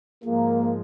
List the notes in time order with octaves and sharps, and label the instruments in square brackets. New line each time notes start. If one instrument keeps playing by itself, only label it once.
[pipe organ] G#2 F3 G#3 [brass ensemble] A#3